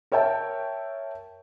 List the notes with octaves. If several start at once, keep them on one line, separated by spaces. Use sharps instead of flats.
A#4 C#5 E5 G5 A5